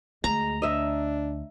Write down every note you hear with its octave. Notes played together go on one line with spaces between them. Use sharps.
D2 G#3 A#5
D4 D#5 E5